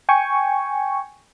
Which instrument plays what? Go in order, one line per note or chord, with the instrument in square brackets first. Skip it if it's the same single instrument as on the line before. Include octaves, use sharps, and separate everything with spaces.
[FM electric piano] G5 G#5 C#6